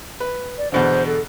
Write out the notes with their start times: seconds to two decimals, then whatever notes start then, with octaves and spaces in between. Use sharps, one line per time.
0.20 B4
0.58 D5
0.72 E2 B2 D3 C5
1.06 A4